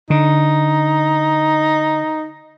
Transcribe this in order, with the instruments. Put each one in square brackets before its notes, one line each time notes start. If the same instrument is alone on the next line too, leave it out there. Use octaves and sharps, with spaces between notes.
[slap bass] D3 [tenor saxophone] D#4